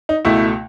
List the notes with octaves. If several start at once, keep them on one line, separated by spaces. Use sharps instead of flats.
D#4
C#2 B2 A3 E4